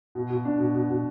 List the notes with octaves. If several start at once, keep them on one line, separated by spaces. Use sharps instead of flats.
B2
B2
D4
B2
B2
B2